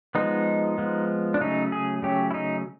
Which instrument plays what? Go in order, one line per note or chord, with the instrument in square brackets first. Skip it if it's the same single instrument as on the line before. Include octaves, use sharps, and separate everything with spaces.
[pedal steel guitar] F3 G#3 B3 D#4
F3 G#3 B3
D4
C#3 F#3 A3 C#4 D#4
G#4
C#3 F#3 A3 C#4 G4
E4
D#4